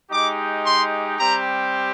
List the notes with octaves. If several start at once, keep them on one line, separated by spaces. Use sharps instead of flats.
G#3 D#4 G4 D6
C6
G3 C4 G4 A#5